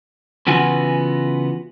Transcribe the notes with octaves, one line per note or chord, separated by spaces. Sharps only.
C#3 E3 B3 F4 F#4 G#5